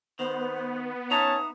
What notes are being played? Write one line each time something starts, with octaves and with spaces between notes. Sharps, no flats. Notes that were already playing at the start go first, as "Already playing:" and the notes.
D#3 B3 C5
C#4 D#4 C#5 E5 A5 A#5 D#6